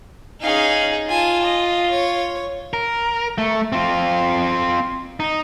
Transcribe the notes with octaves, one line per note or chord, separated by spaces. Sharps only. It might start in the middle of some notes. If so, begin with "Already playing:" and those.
C#4 D#4 G#4 F5
F4 G#5 A5
D#5
C#5
A#4
A3
C4 F4
D#4